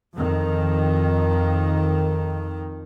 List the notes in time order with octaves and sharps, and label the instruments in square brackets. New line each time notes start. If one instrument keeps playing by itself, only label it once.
[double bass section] F2 D#3